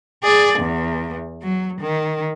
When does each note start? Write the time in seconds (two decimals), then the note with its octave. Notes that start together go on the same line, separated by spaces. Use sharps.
0.24 G#4 D5
0.59 E2
1.42 F#3
1.81 D#3